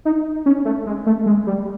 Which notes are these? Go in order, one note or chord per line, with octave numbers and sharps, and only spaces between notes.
D#4
C#4
A3
G#3
A3
G#3
G3